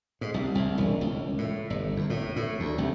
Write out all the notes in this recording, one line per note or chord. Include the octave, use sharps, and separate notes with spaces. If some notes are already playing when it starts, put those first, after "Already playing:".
G#2
C2
C2
E1
C#2
A2
G1
E2
A2
A2
D2
C2